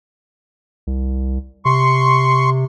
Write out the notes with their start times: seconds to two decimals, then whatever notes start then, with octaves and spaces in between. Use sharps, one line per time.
0.87 C2
1.65 C3 C6 C#6